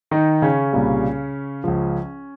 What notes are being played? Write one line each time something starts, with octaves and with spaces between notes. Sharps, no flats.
D#3 D#4
C#3 C#4
C2 A#2 G3
C#2 C#3 F3